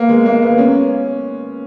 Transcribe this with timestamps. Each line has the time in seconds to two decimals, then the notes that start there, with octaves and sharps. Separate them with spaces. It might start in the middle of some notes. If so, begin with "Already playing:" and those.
Already playing: A#3 B3
0.09 G#3
0.26 A#3
0.42 B3
0.58 C#4